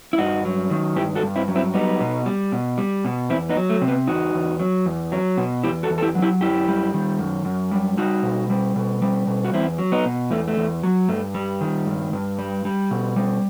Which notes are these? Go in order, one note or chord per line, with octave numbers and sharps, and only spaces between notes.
E4
G2 D#4 F#4
F#3
D#3
G2 E4 G4
F#4 A4
G2
C4 E4
F#3
C4 E4
G3 B3 D#4
B2
G3
B2
G3
B2
E2 C4 E4
B3 D#4
F#3
A3
C3
B3
E2 D#4 F#4
E2
F#3
E2
F#3
B2
E2 E4 G4
F#4 A4
E2
A4
E4 G4
F#3
E4 G4
F#2 E4 G4
G3
D#3
F#2
F#2
G3
G3 D#4 F#4
B2
G3
B2
G3
B2
F#4
E2 C4 E4
F#3
B3 D#4
B2
E2 A3
A3
E2
F#3
G2 A3
G3
D#3
G2
G2
G3
G3
B2
G3